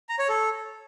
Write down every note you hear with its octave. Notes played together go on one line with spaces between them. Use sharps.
A#5
C#5
A4